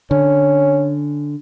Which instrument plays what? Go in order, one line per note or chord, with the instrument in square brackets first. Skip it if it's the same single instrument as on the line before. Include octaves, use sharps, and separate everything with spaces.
[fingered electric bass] D3 [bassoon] C#4